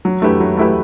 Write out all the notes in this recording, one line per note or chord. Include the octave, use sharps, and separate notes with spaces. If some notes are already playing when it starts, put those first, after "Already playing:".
F#3
A3 E4 G4 B4
F#3
A3 E4 G4 B4